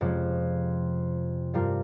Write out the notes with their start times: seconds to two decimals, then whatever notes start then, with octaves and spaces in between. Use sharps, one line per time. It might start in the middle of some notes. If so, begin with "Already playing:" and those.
0.01 F2 C3 F3 G#3 C#4
1.54 G2 G3 C4 F4 A#4